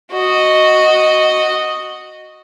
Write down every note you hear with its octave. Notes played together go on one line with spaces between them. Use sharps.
F#4 D#5